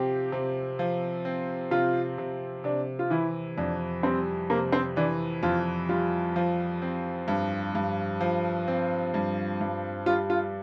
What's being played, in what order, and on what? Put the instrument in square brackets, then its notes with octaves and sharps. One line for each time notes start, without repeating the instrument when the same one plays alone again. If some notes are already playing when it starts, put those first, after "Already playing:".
Already playing: [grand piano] C3 F3 C4 [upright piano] G4
[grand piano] C3
F3
C4
[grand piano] C3 [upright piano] F4
[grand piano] C3
[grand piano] C3 [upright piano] D4
[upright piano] F4
[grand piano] E3 [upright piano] E4
[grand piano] F2 [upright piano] D4
[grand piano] G3 [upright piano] C4
[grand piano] C3 [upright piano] A#3
[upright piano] C4
[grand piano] E3 [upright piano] D4
[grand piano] F2 [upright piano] F4
[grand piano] G3 [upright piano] F4
[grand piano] F3
C4
G2
G2
F3
C4
G2
G2
[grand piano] G3 [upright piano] F4
[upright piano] F4